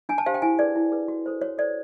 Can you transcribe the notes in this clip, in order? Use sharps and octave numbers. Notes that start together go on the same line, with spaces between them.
D4 G#5
A5
G4 C5 F5
G5
E4 G#5
G#4 B4 D5
E4
G#4 B4
F#4
A4 C5
F#4 C#5
A4 C5 D5